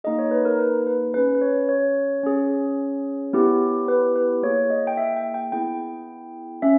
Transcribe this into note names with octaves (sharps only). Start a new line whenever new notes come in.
A#3 D#4 G#4 D#5
C#5
B4
A#4
B4
B4
C#4 G#4 B4
B4
C#5
C#5
C#4 G#4
B3 E4 G4
B4
B4
A#3 E4 G#4 C#5
D#5
G5
E5
G5
G5
B3 E4 G#4 G5
C#4 E5